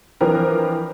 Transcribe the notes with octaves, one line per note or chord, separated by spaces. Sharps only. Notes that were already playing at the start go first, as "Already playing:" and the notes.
E3 F3 C4 D4 A#4 B4